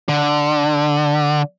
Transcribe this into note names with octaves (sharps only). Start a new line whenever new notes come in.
D3